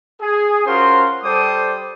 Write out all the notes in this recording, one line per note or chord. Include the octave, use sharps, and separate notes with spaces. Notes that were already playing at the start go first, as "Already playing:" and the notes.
G#4
C#4 F4 F#4 A#4 C5 C6
G3 A4 C5 D5 D6 D#6